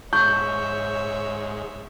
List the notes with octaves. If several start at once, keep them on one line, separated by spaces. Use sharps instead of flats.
G#2 C#5 E5 C#6 G6